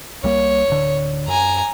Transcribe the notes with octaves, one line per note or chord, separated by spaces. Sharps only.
C2 G3 A#3 C#5
D1 D3
F#2 G#5 A#5